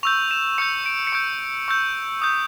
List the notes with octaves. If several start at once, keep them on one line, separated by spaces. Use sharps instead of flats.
C#6 E6 G6 F7
E7
C#6 E6 G6 C#7
D7
C#7
C#6 E6 G6 D7
C#6 E6 G6
D#6 G6